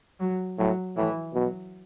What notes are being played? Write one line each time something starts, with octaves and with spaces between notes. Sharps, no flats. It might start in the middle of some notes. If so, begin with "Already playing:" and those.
F#3
A2 F#3
A2 E3
B2 F#3